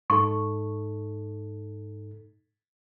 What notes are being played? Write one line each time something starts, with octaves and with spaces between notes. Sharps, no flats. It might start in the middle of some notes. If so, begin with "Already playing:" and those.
G#2 D#4 A4 C#6